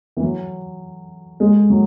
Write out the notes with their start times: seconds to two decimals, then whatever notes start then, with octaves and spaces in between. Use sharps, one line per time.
0.17 E3
0.22 F#3
1.40 G#3
1.70 F#3